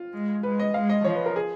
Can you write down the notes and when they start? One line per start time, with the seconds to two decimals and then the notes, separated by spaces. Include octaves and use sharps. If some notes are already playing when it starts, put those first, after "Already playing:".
Already playing: F4
0.13 G#3
0.43 G#3 B4
0.59 D#5
0.74 G#3 F5
0.89 D#5
1.04 F3 C#5
1.15 B4
1.26 A#4
1.36 G#4